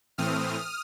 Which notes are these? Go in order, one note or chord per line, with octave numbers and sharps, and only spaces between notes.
A2 E3 A3 C4 D#6 F6